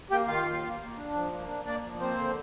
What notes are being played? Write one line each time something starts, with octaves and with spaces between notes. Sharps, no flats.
A#3 G4 G5
D#3 F4 F5
D#2
A#3
A#3
D4
F3
A#3
D4
A#3 D4 D5
F3
A#3 C4 C5
D3